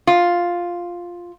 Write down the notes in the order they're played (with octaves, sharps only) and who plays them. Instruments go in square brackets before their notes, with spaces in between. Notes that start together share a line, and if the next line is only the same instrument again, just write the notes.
[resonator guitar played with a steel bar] F4